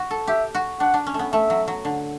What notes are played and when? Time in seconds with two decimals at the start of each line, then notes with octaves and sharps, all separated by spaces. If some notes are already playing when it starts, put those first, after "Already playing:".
Already playing: F#4
0.11 A4
0.28 G4 E5
0.55 F#4
0.80 D4 F#5
0.94 D4
1.07 C#4
1.14 A3
1.19 B3
1.33 A3 E5
1.50 F#3
1.68 F#3
1.85 D3